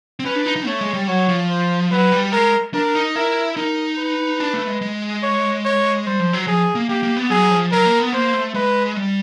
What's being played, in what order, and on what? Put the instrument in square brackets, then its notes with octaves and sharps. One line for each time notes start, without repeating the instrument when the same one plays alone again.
[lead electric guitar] C4
[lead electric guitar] C#4 [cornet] B4
[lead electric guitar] D4
D#4
D#4
[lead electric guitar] A3 [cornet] C#5
[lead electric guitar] G#3
G3
[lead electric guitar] F#3 [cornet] C#5
[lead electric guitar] F3
[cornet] C5
[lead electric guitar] F#3 [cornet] B4
[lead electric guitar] G3
[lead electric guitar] G#3 [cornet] A#4
[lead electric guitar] D4 [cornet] A#4
[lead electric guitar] D#4
[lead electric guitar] E4 [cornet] A#4
[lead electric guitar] D#4 [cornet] A#4
[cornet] B4
[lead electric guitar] D4
A3
G#3
G#3
[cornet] C#5
C#5
[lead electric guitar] G3 [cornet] C5
[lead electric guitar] F3
F#3
[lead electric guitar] F3 [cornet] G#4
[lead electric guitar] A#3
[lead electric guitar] A#3 [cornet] G4
[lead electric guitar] A#3
B3
[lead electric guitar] F#3 [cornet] G#4
[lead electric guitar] F3
[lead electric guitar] F#3 [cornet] A#4
[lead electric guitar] A#3
B3
[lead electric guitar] A#3 [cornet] C5
[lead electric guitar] A3
[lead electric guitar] G#3 [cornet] B4
[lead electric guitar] G3